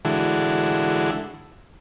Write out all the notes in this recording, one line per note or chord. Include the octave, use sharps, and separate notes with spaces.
D3 E3 G#3 E4 F#4 A4